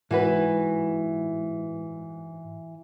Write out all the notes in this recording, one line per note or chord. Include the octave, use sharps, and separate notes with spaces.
G#2 E3 F#4 B4